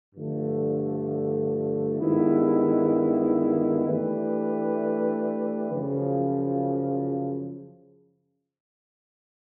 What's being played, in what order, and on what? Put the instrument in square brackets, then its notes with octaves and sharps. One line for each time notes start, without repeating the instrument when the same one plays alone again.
[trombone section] G2 D3 F3 A3
G2 D#3 G#3 B3 E4
E3 A3 D4 G4 B4
F#2 C#3 F3